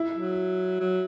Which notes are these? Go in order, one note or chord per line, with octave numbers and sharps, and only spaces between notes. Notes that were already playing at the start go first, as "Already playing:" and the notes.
Already playing: E4 E5
F#3
F#3